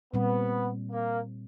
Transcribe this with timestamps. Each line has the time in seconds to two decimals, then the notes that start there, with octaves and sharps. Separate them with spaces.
0.14 A#2 G3 B3 C4
0.92 A#3